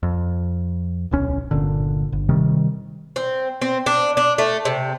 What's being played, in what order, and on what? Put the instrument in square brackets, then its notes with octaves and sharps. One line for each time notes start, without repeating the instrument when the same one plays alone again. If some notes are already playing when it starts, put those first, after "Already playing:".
[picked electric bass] F2
D1 B1 C#4
G1 A#2 D3
G1
C3 D#3 G3
[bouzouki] C4
C4
D4
D4
A3
C3